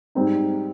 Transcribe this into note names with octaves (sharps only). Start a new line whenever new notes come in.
G#2 G3 C4 D#4